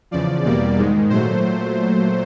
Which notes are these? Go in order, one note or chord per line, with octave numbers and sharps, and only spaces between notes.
E2 C#3 F3 D5
E2 B2 G3 A#3 D5
G#2 D#3 G#3
A#2 F#3 A3 C5